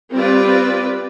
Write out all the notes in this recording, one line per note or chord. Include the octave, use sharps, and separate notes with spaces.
G3 C4 F4 B4 D5